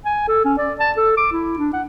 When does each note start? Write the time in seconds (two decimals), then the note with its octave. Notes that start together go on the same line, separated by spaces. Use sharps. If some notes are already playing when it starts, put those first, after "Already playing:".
0.05 G#5
0.28 A4
0.45 C#4
0.58 D5
0.80 A5
0.97 A4
1.17 D6
1.32 E4
1.58 D4
1.73 F#5